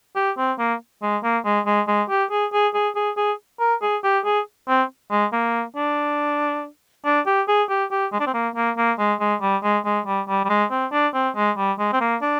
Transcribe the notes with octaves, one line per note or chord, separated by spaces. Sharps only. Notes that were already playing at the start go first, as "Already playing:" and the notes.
G4
C4
A#3
G#3
A#3
G#3
G#3
G#3
G4
G#4
G#4
G#4
G#4
G#4
A#4
G#4
G4
G#4
C4
G#3
A#3
D4
D4
G4
G#4
G4
G4
G#3
D4
C4
A#3
A#3
A#3
G#3
G#3
G3
G#3
G#3
G3
G3
G3
G#3
C4
D4
C4
G#3
G3
G#3
C4
A#3
D4